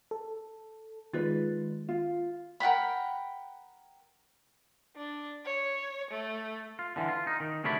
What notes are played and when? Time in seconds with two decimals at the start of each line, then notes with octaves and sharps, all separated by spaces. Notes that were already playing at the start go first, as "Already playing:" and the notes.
0.11 A4
1.13 D#3 G#3 F4 B4 D5
1.88 F4
2.60 A#4 F#5 G5 B5
4.96 D4
5.45 C#5
6.11 A3
6.79 F4
6.96 D3 E3
7.08 F4
7.27 D#4
7.40 D#3
7.64 D2 C3 A3 C#5 D5 B5